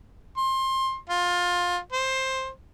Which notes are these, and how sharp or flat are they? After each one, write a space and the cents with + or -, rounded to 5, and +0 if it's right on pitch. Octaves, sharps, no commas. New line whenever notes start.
C6 +20
F4 +20
C5 +10